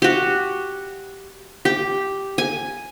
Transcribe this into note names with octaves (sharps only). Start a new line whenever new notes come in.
F#4 G4
G4
G#5